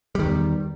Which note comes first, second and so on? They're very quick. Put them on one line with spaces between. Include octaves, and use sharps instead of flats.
G3 D#3 E2